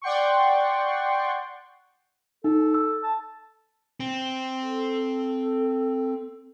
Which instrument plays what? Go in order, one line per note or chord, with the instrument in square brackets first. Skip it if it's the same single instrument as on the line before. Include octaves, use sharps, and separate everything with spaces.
[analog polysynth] D5 F#5 G5 C6 C#6
[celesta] D#4 [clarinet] A4
[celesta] E6
[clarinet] A5
[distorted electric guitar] C4
[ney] A4